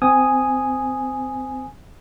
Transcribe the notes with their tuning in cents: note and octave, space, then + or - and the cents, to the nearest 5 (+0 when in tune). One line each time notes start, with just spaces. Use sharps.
C4 -20 G#5 +0 D#6 +0